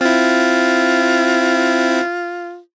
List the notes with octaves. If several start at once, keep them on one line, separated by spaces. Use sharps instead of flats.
C4 E4 F4